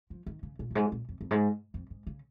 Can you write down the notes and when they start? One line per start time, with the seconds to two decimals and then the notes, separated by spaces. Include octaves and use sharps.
0.10 F3
0.26 D#3
0.43 C#3
0.59 A#2
0.70 F2
0.75 G#2
0.92 A#2
1.09 F2
1.21 F2
1.31 G#2
1.74 F2
1.90 G#2
2.07 C#3